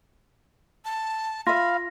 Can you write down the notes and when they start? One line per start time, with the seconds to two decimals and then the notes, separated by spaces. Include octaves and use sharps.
0.85 A5
1.47 F4 E5 F5 B5 A#6